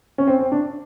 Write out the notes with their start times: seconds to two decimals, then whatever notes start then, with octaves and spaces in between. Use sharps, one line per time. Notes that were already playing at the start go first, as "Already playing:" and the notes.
0.18 C#4
0.27 C4
0.39 C4
0.52 D4